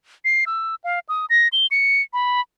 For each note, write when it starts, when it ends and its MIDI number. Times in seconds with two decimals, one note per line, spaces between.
0.25 0.44 96
0.46 0.75 88
0.84 0.99 77
1.09 1.26 87
1.30 1.48 94
1.53 1.67 103
1.71 2.02 97
2.13 2.41 83